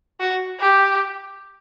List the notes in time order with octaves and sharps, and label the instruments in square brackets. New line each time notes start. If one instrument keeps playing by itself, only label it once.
[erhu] F#4
G4